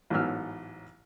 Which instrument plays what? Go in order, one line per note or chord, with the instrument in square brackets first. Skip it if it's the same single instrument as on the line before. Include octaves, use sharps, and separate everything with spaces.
[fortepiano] A1 G#2 F#3 B3 E6 F6